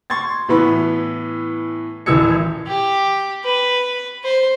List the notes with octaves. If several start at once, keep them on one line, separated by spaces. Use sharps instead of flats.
C6 C#6 G#6 A6
A2 E3 B3 B5
D#1 A1 E3 E6 G#6 C#7
G4
B4
C5